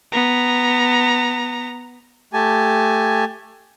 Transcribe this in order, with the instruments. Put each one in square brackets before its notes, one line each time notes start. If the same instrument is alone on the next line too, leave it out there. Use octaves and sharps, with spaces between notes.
[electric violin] B3 A#5
[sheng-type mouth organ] A3 G4 G#5 A5